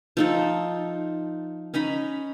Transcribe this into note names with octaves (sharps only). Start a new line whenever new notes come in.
F3 D#4 A4
C#4 D#4 A#5 B5